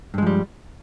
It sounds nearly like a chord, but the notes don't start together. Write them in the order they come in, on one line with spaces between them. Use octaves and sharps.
G2 G#3 F3 G3